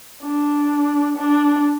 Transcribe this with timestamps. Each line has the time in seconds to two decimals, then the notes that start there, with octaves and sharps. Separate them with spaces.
0.23 D4
1.17 D4